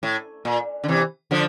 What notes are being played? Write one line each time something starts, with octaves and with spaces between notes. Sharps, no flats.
A2
A#2
D3
C3 E3
D3 F3